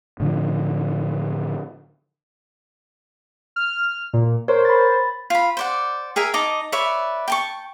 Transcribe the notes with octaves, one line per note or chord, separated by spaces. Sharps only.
A2 D3 F3
F6
A#2
A#4 C5 C#5
B5 A6
F4 B5
C5 D5 F#5
G#4 A#4 E5 G#5
D#4 D#5 A5 D6
B4 C#5 D5 E5
G5 A5 C#6